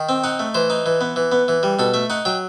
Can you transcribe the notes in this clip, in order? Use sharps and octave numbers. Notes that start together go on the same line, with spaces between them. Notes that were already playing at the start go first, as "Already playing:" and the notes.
Already playing: D#3
C4
D#4 F#5
A3
E3 C5
D#4
E3
B3
E3
B3
E3
G3
B2 A4
A3 E5
D#4 F#5
F#3 G5